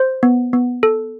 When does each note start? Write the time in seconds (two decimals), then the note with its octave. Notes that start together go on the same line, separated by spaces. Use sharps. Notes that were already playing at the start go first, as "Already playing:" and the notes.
Already playing: C5
0.23 B3
0.53 B3
0.83 A4